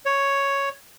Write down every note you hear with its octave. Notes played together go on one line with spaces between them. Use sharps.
C#5